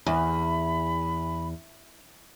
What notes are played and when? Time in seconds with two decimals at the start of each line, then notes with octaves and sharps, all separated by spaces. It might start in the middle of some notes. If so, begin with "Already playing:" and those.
0.06 E2 B5